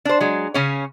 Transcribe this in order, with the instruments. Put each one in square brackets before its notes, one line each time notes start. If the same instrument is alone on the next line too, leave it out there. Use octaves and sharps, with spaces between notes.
[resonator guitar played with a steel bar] D4 C5
F#3 G#3
C#3 C#4 C#5